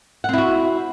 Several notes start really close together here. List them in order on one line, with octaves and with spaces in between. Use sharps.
F#5 C4 E4 F#4